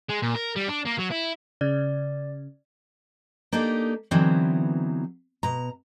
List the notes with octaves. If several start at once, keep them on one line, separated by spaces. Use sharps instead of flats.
G#3
A#2
A#4
G3
D4
A#3
F#3
E4
C#3 D5
A#3 D4 D#4 G4 A4 A#4
D3 E3 F#3 B3 C4 D#4
B2 A#5